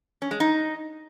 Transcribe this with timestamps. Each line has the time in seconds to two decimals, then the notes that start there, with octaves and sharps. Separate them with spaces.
0.22 C#4
0.31 G#3
0.40 D#4